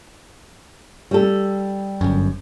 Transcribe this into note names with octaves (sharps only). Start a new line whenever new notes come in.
G3 A4
G1 F#2